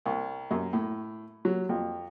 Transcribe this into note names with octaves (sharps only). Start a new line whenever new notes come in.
C2
F#2
A2
F#3
F2